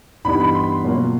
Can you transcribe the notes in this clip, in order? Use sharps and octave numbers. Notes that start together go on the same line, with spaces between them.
G2 E3 G3 B3 D#4 B5
B5
C6
B2 F#3 A#3 C#4 F4